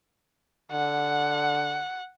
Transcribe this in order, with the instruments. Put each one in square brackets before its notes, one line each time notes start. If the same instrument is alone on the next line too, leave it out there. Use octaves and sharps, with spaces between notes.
[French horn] D3 [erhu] F#5